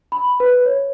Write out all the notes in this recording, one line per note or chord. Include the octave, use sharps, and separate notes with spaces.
B5
B4
C#5